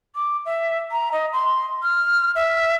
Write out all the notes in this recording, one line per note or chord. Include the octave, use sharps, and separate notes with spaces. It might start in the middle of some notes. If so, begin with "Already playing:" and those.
D6
E5
A#5
D#5
C6
F6
E5